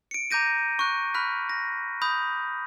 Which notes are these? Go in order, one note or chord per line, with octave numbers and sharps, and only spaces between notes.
C#7 D7
A#5 D6 G6 A#6 D#7
C#6 F#6
B5 F6 F#6 B6
A#6
B5 D#6 G6